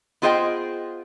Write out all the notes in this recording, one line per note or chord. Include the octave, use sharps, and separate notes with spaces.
B3 F4 G#4 C5 D#5 G5